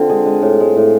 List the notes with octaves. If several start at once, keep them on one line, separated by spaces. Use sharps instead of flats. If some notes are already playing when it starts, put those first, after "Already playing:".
Already playing: D3 C4 F4
G#3 G#4
G#3
A2
G#3
A2